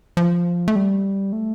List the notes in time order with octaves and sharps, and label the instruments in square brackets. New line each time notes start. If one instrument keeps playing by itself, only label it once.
[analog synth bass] F3
A3
G3
A3